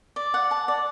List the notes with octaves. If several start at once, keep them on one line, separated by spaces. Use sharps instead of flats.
D5
F#5
A5
D5